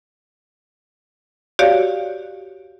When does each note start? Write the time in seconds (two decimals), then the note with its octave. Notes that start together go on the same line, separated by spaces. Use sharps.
1.59 F#4 G4 C#5 D5 F5